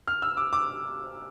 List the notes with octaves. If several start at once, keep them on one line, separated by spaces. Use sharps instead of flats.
F6
E6
D6
D6